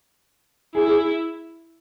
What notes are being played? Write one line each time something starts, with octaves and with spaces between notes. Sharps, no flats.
E4 G#4
G#4